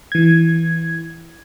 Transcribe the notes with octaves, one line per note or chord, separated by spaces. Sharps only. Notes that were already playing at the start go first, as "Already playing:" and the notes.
E3 G#6